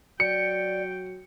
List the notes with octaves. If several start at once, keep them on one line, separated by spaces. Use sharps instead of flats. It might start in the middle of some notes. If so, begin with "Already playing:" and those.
F#3 D5 G5 C#7